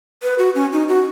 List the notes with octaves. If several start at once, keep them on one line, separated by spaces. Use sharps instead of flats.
B4
F#4
C#4
D#4
F#4